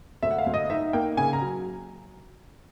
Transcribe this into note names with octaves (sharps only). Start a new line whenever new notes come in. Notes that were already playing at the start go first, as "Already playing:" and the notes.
D2 E5
F#5
F5
D2
D#5
D#4 E5
A#3 G5
C#3 G#5
A#5
F#3